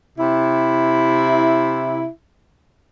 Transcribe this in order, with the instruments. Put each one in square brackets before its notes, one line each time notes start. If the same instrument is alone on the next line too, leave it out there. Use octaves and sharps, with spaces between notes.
[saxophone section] C3 E4